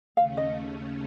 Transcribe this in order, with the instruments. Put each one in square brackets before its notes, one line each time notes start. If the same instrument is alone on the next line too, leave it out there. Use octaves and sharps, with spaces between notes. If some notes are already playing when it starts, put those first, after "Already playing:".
[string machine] D#2 C#3 A3 C#4 [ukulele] F5
[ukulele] D#5